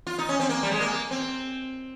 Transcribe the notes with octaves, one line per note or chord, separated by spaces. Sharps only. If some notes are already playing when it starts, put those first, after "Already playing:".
F4
D#4
C#4
C4
A#3
G3
G#3
A#3
C4